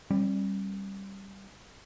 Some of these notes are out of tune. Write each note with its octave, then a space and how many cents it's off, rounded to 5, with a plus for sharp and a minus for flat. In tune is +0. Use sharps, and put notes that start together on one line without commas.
G3 +0 C#4 -45